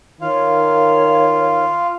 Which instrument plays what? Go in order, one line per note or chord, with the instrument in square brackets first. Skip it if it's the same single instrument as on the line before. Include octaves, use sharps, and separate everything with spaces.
[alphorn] D#3 [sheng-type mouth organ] F4 F5 [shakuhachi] C#5